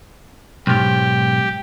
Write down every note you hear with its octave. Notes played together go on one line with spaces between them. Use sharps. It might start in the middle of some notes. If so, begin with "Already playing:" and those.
B1 G#2 G4